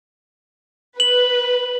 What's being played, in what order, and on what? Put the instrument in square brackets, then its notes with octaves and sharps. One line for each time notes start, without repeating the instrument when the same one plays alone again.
[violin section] B4 [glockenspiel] F#7